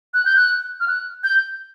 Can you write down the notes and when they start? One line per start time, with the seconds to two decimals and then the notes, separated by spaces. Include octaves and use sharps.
0.14 F#6
0.25 G6
0.36 F#6
0.80 F6
0.88 F#6
1.24 G6